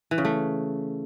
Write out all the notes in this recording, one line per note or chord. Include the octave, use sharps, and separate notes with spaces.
E3
C#3
A3